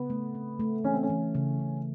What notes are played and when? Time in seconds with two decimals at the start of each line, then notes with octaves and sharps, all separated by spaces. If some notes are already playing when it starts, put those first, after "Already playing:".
Already playing: C#3 B3
0.10 A3
0.35 C4
0.60 A3
0.84 E3 C#4
0.94 C4
1.03 C#4
1.10 E3
1.35 C#3
1.59 C#3